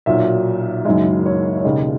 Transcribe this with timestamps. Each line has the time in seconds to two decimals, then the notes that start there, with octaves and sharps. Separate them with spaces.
0.06 B1 A#2 F#3 E5
0.85 F#1 F#2 D#3 G#3 E5
1.26 C#5
1.57 C#5
1.64 E1 D#2 C#3 D#5